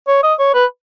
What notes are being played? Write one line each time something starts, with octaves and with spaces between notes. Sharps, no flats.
C#5
D#5
C#5
B4